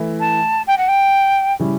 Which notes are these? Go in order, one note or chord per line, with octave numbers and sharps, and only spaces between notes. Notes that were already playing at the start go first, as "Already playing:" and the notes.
Already playing: E3 A3 E4
A5
G5
F#5
G5
C#3 G3 C#4 E4